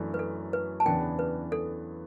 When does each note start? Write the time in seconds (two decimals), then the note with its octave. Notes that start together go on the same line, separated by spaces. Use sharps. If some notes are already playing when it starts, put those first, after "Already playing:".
Already playing: F#2 E3 A3 D4
0.14 B4
0.19 A4
0.53 B4
0.80 A5
0.86 E2 C#3 E3 B3 D4 G5
1.19 B4
1.52 A4